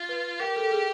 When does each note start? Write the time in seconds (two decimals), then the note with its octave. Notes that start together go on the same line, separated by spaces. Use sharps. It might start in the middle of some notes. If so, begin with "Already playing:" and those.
Already playing: F4
0.09 B4
0.40 G4 A#4
0.56 A4
0.71 G#4